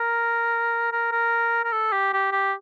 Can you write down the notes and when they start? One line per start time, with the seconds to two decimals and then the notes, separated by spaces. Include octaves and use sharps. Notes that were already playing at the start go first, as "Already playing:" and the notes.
Already playing: A#4
0.92 A#4
1.12 A#4
1.65 A#4
1.72 A4
1.92 G4
2.13 G4
2.32 G4